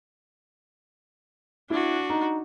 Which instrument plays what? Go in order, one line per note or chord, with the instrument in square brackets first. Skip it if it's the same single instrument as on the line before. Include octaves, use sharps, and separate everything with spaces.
[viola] D4 F#4 [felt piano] E4
[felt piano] D#4